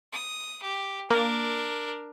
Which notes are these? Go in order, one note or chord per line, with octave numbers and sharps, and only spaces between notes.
D#6
G4
A#3 D4 A#4